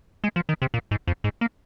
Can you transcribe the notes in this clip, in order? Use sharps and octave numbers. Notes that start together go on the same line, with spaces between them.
G#3
F3
D#3
C3
A#2
G#2
F2
G#2
A#3